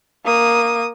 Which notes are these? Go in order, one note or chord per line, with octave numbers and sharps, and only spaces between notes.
A#3 D#6